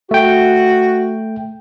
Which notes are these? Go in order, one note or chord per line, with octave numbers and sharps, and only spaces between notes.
A3 F#4 G5